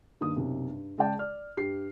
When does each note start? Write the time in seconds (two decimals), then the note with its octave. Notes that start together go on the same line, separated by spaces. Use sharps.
0.21 G2 D#3 A#3 D#6
0.36 B1 F#2 C3
0.69 G2
0.98 C#3 G#3 G#4 D5 G5 A5
1.19 D5 F6
1.57 G2 G4 C7